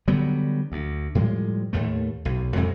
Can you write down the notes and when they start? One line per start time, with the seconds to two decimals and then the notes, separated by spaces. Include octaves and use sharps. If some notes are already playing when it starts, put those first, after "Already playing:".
0.07 D3 F#3 G3 B3
0.72 D2
1.15 A2 F3 G3 G#3
1.73 D#2 A2 A3
2.25 B1
2.55 F2 C3 F#3 G#3